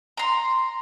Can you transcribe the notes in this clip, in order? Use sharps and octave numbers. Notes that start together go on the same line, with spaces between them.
A#5 C6